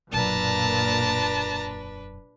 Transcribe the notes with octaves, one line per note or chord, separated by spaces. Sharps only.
E1 F#2 A#2 D4 B4 A5 A#5